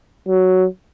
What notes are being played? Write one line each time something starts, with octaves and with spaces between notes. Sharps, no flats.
F#3